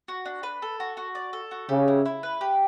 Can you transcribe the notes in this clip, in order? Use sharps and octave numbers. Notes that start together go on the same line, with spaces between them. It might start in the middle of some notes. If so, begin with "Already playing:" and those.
F#4
D4
B4
A4
F#4
F#4
D5
A4
F#4
C#3 G4
E4
E4
B4
G4